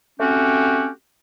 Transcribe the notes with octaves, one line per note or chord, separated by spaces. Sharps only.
A3 C4 C#4 F#4 G4